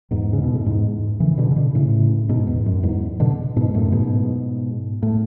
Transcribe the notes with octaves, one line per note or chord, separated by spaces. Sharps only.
E2 G#2
C#3
B2
A2
E2 G#2
C#3 E3
B2 D3
C#3
B2 D3
A2 C#3
G#2 B2
E2
F#2
E2 G#2
B2 D3
G#2 B2
F#2 A2
G#2 B2
A2